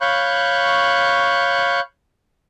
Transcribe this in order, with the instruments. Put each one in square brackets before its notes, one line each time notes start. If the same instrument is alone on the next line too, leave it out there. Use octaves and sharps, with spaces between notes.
[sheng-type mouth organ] C#5 F5 B5 C#6 F#6 G6